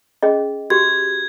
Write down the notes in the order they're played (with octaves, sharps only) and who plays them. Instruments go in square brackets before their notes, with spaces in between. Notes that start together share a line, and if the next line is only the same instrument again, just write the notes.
[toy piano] C#4 G#4 D#5
[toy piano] F#4 G4 [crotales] G#6